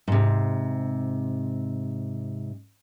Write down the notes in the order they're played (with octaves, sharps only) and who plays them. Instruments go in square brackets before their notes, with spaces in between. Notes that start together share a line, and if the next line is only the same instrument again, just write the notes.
[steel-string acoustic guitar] G#2 C3